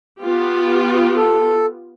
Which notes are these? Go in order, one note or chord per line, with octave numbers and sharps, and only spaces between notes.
B3 F4 G4
A4